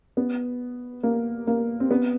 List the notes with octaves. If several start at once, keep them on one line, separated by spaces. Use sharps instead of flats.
B3
A#3
A#3
C4
B3